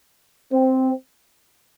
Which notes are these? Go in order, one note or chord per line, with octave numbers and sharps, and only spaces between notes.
C4